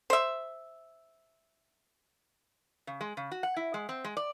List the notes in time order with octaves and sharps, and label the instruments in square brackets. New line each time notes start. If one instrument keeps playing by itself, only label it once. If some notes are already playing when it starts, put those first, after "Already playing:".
[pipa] C5 E5
[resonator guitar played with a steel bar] C#3
G#3
C#3
F#4
F#5
E4
G#3
C4
G#3
D5